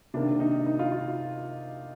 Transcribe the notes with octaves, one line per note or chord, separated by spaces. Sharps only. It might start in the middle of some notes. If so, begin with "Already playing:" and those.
C3 D#3 A#3 D4
D#4
D#4
F4
F4